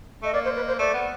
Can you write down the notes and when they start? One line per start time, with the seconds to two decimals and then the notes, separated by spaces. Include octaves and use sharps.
0.22 A3 D#5
0.34 A#3 D5
0.45 C5
0.56 B4
0.68 C5
0.79 A3 D5
0.94 B3